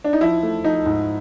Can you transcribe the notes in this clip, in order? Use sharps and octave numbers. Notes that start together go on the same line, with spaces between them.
D4
D#4
F3 E4
A3
F3 D#4
G#2